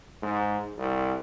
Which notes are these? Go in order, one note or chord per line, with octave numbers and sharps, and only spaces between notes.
G#2
C2